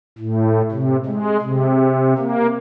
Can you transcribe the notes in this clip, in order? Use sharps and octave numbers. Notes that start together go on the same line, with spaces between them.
A2
C3
G#3
C3
A#3